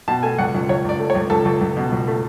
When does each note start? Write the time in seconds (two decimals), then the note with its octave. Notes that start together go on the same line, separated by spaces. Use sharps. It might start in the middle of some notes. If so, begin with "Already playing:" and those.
0.08 B2 A5
0.23 A3 G#5
0.38 C#2 F#5
0.54 C#2
0.69 C#2 C#5
0.85 C#2 D5
1.00 A3
1.10 C#5
1.15 C#2
1.30 C#2 A4
1.45 C#2
1.61 C#2
1.77 B2
1.92 C#2
2.07 A3